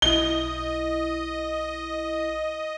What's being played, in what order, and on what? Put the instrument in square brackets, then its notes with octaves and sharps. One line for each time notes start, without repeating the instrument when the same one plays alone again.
[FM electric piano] B1 E4 [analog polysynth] D#5 [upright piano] G7